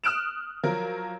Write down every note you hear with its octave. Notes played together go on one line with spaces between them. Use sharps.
D#6 F6 F#6 D7 E7
F3 F#3 A#4